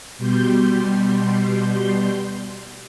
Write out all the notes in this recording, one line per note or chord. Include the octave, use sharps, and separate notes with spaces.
B2 G3 C6 G6